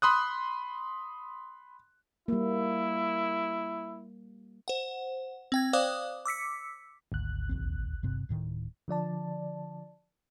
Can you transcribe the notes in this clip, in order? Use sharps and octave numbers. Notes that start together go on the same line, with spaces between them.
B5 C6 D#6 F#6
G3 A#3 E4
C5 F#5
C4 G5 G#6
C5 D5 F5 D6 D#6 F#6
D6 E6 B6 C#7
G#1 D2 F#6
A#1 D#2 C4
G2 C3 C4
D1 A2 D#3
D3 F3 D5 A5